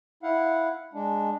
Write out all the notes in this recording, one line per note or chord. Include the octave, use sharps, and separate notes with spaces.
E4 F5 F#5
G#3 D4